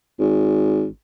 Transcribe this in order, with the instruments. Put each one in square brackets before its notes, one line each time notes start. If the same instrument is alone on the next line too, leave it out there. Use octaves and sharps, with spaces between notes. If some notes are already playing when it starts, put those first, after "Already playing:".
[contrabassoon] G#1